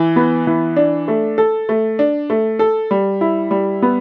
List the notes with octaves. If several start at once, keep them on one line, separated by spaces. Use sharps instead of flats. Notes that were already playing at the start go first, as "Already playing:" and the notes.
Already playing: E3
B3
E3
D4
A3
A4
A3
D4
A3
A4
G3
E4
G3
B3